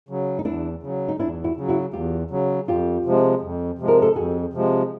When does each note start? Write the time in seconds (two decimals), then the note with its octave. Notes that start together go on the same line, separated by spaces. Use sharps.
0.09 C#3 F#3
0.39 D#4
0.45 E2 D4 E4
0.83 C#3 F#3
1.08 D#4
1.20 E2 D4 E4
1.44 E4 F#4
1.57 C#3 F#3
1.69 E4 F#4
1.93 E2 F4 G4
2.31 C#3 F#3
2.68 F2 F4 G4
3.05 C3 F3 G#3
3.42 F2
3.79 C3 F3 G#3
3.88 A#4
4.02 A4
4.16 F2 F#4 G#4
4.53 C3 F3 G#3